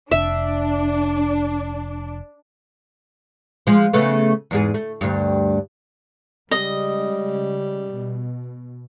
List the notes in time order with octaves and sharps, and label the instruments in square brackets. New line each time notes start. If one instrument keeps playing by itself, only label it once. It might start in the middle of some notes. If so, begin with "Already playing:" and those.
[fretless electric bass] F1 [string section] D4 [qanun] E5
[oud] F3 G#3
C#3 A3 B3
E2 G#2 G#4
A3
D2 G2
[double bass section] C#3 G#3 [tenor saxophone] G3 [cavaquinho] D#5
[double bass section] B2